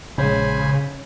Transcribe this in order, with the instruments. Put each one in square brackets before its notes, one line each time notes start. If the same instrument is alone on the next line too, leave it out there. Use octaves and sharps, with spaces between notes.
[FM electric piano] A#1 G#3 [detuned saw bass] C#3 [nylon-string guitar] C#4 [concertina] C5 G#5 B5